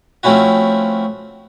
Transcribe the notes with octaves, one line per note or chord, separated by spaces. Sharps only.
F3 A3 C4 C#4 E4 F#4